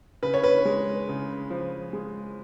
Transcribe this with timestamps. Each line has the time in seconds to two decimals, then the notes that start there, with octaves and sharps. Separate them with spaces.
0.23 C#3 B4
0.34 C#5
0.44 B4
0.65 G#3
1.09 C#3
1.50 F3
1.93 G#3